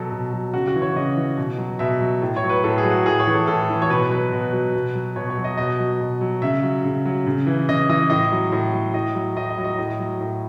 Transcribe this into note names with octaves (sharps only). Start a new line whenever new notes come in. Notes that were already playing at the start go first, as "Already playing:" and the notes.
Already playing: B2 F#3 A4
B2
F#3
C#3 F#4
F#4
E3
C#5
C#3 D#5
E3
B2
F#3
B2 E5
F#3
A2
C#5
F#3
B4
A2 A4
G#4
F#3
F#4
A2 G#4
C#5
E3
A4
A2 A4
E3
C#5
B2 B4
F#3 B4
B2
F#3
B2
F#3
B2 C#5
C#5
F#3
D#5
B2 D#5
F#3
B2
F#3
C#3 E5
F#3
C#3
F#3
C#3
E3
C#3 D#5
E3 D#5
A2 D#5
F#3
A2
F#3
A2 D#5
F#3
A2 D#5
D#5
F#3
D#5
A2 D#5
F#3
A2